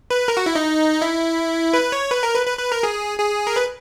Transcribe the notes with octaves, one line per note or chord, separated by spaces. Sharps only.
B4
A#4
F#4
E4
D#4
E4
B4
C#5
B4
A#4
B4
B4
B4
A#4
G#4
G#4
A#4
B4